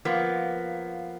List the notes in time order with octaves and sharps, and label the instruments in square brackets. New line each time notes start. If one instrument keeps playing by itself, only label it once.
[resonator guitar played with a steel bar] F3 A#3 B3